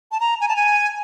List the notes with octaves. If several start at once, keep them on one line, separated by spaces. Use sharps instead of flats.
A5
A#5
G#5
A5
G#5